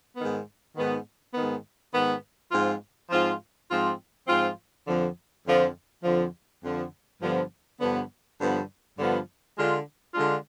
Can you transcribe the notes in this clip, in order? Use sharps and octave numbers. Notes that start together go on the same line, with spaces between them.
G#2 D#3 B3
G#2 D#3 B3
G#2 D#3 B3
G#2 D#3 B3
G#2 F3 C4 F4
G#2 F3 C4 F4
G#2 F3 C4 F4
G#2 F3 C4 F4
F2 D3 F3
F2 D3 F3
F2 D3 F3
F2 D3 F3
G2 D3 F3 B3
G2 D3 F3 B3
G2 D3 F3 B3
G2 D3 F3 B3
D3 G#3 D4 F4
D3 G#3 D4 F4